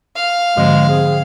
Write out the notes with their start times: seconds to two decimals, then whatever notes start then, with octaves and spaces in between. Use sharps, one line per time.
0.16 F5
0.57 G#2 D3 F3 G#3 C4
0.89 C4 G#4